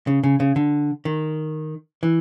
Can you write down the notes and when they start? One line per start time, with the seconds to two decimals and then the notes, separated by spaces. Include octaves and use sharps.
0.07 C#3
0.24 C#3
0.40 C#3
0.56 D3
1.05 D#3
2.03 E3